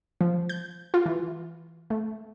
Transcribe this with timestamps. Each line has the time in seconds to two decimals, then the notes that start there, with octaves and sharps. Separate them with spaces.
0.21 F3
0.49 G6
0.94 F4
1.06 E3
1.90 A3